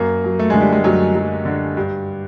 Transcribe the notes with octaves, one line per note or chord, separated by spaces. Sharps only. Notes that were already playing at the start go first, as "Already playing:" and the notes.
Already playing: F#2 A#3
F#3
A3
D3 G#3
G3
G#3
F#2 F#3
F#3
D3
G2